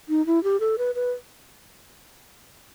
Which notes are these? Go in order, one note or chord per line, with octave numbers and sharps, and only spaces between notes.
D#4
E4
G4
A4
B4
B4